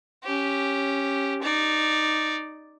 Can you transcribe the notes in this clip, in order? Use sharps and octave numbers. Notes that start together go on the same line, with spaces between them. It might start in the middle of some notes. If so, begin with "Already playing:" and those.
C#4 G4
D#4 D5